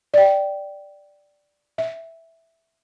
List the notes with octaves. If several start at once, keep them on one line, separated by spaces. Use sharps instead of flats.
D5 G5
E5